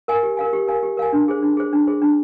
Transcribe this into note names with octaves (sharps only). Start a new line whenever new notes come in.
A#4 F5 G#5
G4
A#4 F5 G#5
G4
A#4 F5 G#5
G4
A#4 F5 G#5
D4
G#4 C5
D4
G#4 C5
D4
G#4 C5
D4